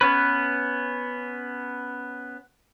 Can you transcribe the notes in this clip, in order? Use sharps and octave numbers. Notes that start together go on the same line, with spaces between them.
B3 C#4 B4